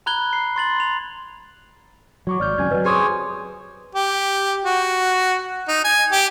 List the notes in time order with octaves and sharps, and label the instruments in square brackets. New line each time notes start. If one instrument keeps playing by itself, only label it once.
[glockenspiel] A#5 B5 F#6 G#6 G7
C7
C6 A6 F#7
F7
[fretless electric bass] F#3 [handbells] C#5 C#6 D6
[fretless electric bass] G#1 [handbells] D5 F6 G6
[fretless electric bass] C#2 F#2 [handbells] C4 G#5 G#6
[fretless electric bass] F3 F#3 [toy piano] B4 D#5
[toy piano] G4 C6 D#6 [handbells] G#4 D6 [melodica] C5 C#5 G#5
[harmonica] G4
F#4
D#4
G#5
G4